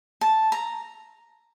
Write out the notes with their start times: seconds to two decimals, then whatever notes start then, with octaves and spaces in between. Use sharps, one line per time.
0.21 A5
0.52 A#5